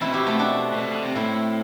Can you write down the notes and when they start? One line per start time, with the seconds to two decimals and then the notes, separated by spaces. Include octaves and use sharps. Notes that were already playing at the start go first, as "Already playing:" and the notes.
0.01 B2 C4 E4
0.13 E4 G4
0.27 A3 C4
0.39 D4 F#4
0.73 C3
0.77 B2
0.91 D3
1.03 C3
1.15 A2 C4 E4